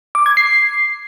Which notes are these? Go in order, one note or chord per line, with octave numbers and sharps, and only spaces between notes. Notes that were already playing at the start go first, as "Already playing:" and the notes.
D6
G#6
C7